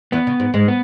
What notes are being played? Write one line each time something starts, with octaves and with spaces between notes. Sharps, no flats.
E2 E3 B3
C#3
G#2
G#2 G#3
B3